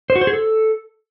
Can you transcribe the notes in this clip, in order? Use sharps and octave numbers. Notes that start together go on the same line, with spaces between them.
C5
F#4
C5
G#4
A4